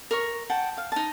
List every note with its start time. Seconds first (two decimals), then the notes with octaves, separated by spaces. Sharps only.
0.11 A#4 C#5 C#6
0.50 F#5 G5 A5
0.77 F5
0.92 D#4 A5